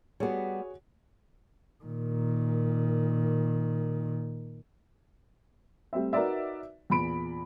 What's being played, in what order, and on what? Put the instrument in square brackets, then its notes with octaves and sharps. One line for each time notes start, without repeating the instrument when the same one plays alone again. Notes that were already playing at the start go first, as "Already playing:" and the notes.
[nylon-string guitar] G3 B3 [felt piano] F#4 G#4 C#5
[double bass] A#2 D#3
[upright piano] G3 A3 C4 E5
D#4 F#4 A#4 B4 D5 E5
E2 A#2 B5 D7